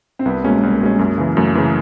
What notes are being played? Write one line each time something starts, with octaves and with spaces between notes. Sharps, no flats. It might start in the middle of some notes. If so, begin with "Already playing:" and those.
C4
C2 B3
B2 G#3 A#3 C#4
C2
B2 G#3 C#4
F#2
C#3 E3
F#2 A3
C#3 E3